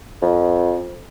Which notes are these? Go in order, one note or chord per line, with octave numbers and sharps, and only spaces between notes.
F2